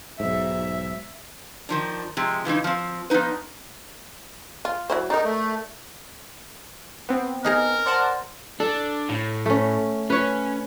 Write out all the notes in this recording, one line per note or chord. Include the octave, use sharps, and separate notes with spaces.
B1 G#2 E5
D#3 F3 D4
C3 F3 G#3
C#3 E3 F3 D#4
F3 C4
F3 B3 D4 D#4 B4
F4
F#3 E4 C5
D4 D#4 A#4
A3
B3 C4
D#4 G#4 A#4 A#5
C5 D5 F#5 A5
D4 A4
A2
A3 C#4
C#4 B4 C#5